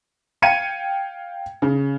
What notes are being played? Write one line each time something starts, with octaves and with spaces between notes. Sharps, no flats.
F5 G5 G#6 C#7 D#7
C#3